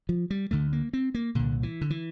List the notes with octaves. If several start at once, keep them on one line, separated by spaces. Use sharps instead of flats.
F3
G3
D2 D3 A3
A#3
C4
A#3
C2 A#2 D3
E3
D3
E3